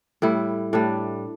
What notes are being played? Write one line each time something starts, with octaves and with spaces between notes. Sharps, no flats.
A2 G3 E4
A2 G3 D4